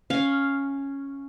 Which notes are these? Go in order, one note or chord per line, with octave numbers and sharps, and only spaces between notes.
C#4 F5